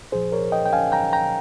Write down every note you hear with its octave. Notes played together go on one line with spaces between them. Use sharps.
C2 A#2 F3 G#4 C5
A#4 C#5
D#5 G5
G5
F5 G#5
G5 A#5
G5 A#5